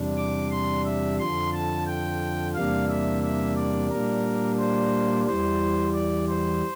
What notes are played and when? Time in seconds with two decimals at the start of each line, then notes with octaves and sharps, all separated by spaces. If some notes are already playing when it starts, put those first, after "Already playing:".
Already playing: E2 C3 G3 D4
0.18 D6
0.51 C6
0.85 E5
1.19 F2 D3 F3 C6
1.53 A5
1.87 G5
2.55 E2 C3 G3 A#3 D4 F5
2.89 E5
3.23 E5
3.57 D5
3.90 A#2 G3 A#3 D4 A#4
4.59 C5
5.27 E2 E3 G3 C5
5.94 D5
6.28 C5